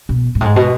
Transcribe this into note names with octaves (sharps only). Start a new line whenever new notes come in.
B2
G#2
A2
G#2
B2